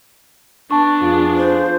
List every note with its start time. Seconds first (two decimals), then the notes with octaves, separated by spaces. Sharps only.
0.71 B3 D4 A5 C#6
1.01 F2 F4 G#4
1.37 C5